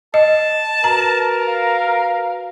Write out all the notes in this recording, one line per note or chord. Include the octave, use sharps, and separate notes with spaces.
D#5 A5
F#4 A#4 B4 A#5
F5